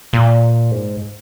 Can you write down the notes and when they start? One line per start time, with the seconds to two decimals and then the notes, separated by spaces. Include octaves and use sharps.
0.13 A#2
0.71 G#2